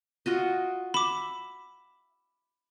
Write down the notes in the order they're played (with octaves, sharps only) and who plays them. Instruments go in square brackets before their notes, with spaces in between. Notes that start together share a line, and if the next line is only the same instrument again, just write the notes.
[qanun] F4 F#4 D#5
[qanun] E5 [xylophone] B5 D6